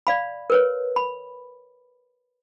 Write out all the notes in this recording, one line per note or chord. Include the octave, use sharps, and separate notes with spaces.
D5 F5 B5
A#4 B4 C#5
B5